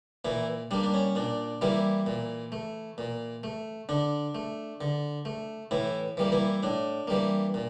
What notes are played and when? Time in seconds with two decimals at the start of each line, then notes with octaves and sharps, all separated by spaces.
0.25 A#2 E3 E4
0.71 G3 A#3 D4
0.83 D4
0.94 C#4
1.16 A#2 D4
1.61 E3 G3 A#3 E4
2.06 A#2
2.52 A3
2.98 A#2
3.43 A3
3.89 D3 D4
4.35 A3
4.81 D3
5.25 A3
5.71 A2 E3 E4
6.17 E3 G3 A#3
6.32 E3 E4
6.63 A2 D4
7.08 E3 G3 A#3
7.54 A#2